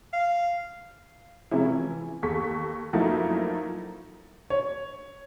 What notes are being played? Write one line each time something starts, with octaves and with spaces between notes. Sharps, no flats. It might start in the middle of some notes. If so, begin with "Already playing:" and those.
F5
C3 F3 G#3 C#4 E4
E3
D#2 A4 C#6 B6
F#2 F3 A3 A#3 D#4 E4
C#5